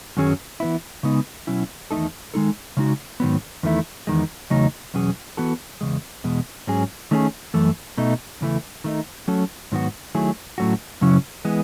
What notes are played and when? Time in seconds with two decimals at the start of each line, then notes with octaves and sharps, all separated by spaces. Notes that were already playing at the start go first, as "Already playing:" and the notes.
0.17 F#2 D#3 F#3 C#4 G#4
0.60 E3 B3 E4
1.03 C#3 G#3 B3 D#4
1.47 B2 F#3 C#4 E4
1.91 E2 D#3 A3 D#4 A4
2.34 D#3 G#3 D#4 A4
2.77 C#3 G#3 D#4 F#4
3.20 G#2 D#3 F#3 B3
3.63 E2 D#3 A3 E4
4.07 E2 D#3 G#3
4.50 E2 C#3 F#3 A3 D#4
4.94 E2 B2 F#3 C#4 G#4
5.37 E3 B3 F#4 A4
5.81 E2 C#3 G#3
6.24 E2 B2 G#3
6.67 G#2 F#3 C#4 G#4
7.11 D#3 A3 C#4 G#4
7.54 F#2 E3 A3
7.97 B2 A3 D#4
8.41 E2 C#3 E3 A3
8.84 D#3 A3 D#4
9.28 F#3 A3 C#4 F#4 A4
9.72 G#2 D#3 F#3 B3 F#4
10.15 D#3 F#3 A3 E4 G#4
10.58 A2 F#3 A3 C#4 F#4
11.01 F#2 C#3 F#3 C#4 E4
11.45 E3 G#3 B3